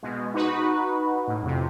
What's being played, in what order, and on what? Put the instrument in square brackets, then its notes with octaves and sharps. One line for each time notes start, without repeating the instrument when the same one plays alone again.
[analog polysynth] B2 G#3
D#4 F#4 B4
A2
F2 C3